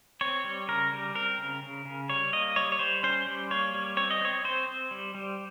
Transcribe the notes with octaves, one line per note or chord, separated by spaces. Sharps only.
C4 C#5
G3
C#3 A#4
G3
C4 A#4
C#3
C#3
C#3
G3 C#5
A#3 D#5
G3 C#5
C#5
G3 C5
C#4 C5
G3
A#3 C#5
G3
C4 C#5
D#5
C4 C#5
C4 C5
C4
G3
G3